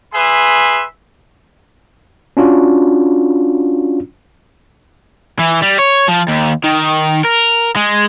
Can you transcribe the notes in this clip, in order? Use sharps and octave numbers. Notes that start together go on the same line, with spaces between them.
G#4 B4 E5 C6
C#4 D4 F4 F#4
E3
G3
C#5
F3
D#2
D#3
A#4
G#3